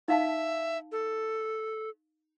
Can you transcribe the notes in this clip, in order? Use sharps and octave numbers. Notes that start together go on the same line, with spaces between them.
D#4 E5 F5 A5
A4